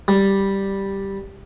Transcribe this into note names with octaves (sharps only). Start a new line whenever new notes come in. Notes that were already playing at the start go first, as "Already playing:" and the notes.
G3